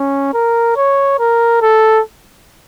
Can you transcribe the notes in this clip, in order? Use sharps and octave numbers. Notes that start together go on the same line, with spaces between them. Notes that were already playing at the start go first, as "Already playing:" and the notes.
Already playing: C#4
A#4
C#5
A#4
A4